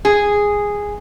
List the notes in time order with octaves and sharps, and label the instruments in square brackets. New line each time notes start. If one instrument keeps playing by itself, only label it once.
[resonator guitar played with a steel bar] G#4